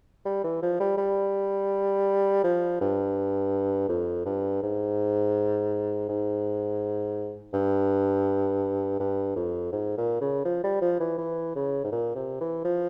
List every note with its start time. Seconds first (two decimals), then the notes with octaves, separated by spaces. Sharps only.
0.25 G3
0.44 E3
0.62 F3
0.80 G3
0.97 G3
2.44 F3
2.81 G2
3.89 F2
4.26 G2
4.63 G#2
6.09 G#2
7.53 G2
9.00 G2
9.36 F2
9.72 G#2
9.98 A#2
10.21 C#3
10.45 F3
10.64 G3
10.81 F3
11.00 E3
11.18 E3
11.56 C#3
11.84 G#2
11.92 A#2
12.15 C3
12.41 E3
12.65 F3